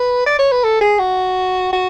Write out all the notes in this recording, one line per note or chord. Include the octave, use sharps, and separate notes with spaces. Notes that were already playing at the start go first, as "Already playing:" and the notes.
Already playing: B4
D5
C#5
B4
A4
G#4
F#4
F#4